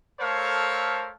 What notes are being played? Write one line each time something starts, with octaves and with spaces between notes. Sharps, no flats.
A3 A4 A#4 C5 C#5 F5